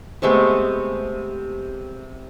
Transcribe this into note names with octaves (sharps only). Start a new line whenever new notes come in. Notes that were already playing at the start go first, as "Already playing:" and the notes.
C3 G#3 A3 B3